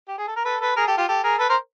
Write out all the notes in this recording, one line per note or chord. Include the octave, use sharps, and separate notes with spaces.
G4
G#4
A4
A#4
A4 B4
A4 B4
G#4 A#4
G4 A4
F4 G4
G4 A4
G#4 A#4
A4 B4
A#4 C5